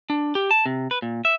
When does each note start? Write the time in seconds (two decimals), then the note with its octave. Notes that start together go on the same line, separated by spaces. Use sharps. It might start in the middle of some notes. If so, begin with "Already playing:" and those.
0.10 D4
0.35 G4
0.51 A5
0.66 C3
0.91 B4
1.02 A#2
1.25 E5